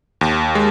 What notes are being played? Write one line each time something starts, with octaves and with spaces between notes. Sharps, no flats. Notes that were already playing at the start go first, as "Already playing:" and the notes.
D#2
G#3